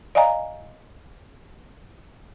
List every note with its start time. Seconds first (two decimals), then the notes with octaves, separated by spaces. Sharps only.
0.15 D5 D#5 F5 G#5 A#5